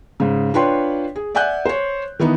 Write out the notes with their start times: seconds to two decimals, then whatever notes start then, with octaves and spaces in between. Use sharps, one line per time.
0.20 G#2 C#3
0.54 D4 F4 B4 C#5 G5 C6
1.16 G#4
1.35 D5 E5 F#5 G#5 F#6 G6
1.66 C5 C#5
2.19 D#3 E3 B3 D#4